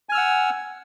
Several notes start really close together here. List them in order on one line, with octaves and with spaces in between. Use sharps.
G#5 F6 E6 F#5